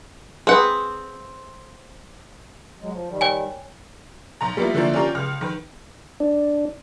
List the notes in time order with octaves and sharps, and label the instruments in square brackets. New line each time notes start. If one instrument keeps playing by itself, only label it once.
[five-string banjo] C4 F#5 [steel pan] G#4 B4
[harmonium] F#3 G#3
F3
D#3 G3
[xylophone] C#5 G5 G#5
[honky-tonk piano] B1 A#5
G3 A#3 B3 E4 F4
D3 E3 F3 A3 A#3 D4
C#4 D4 F4 G4 A#4 D5
C#2 F6
D#3 B4
[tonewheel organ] D4